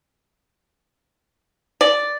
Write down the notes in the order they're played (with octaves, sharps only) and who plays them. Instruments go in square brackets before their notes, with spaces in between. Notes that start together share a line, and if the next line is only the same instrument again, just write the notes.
[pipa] D5